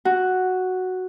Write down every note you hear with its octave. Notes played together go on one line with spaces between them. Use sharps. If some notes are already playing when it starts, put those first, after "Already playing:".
F#4